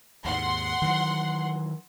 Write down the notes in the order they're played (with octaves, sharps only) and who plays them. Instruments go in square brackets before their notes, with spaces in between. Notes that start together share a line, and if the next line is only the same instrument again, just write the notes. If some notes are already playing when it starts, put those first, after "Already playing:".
[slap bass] D#2 G#2 [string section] F#5 C6
[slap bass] D#3 E3 F#3